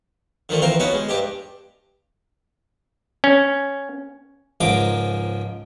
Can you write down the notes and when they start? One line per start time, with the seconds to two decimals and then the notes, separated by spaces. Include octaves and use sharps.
0.49 D3 D#3 F3 A3
0.62 E3 F3 C4 A#4
0.80 B3 C#4 D#4 F#4
0.94 G#3
1.09 G2 D4 G4
3.24 C#4
4.61 C#2 G#2 F3 A#4 D6